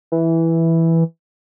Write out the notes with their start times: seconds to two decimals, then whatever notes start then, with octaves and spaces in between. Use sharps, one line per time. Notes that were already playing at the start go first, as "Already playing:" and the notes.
0.12 E3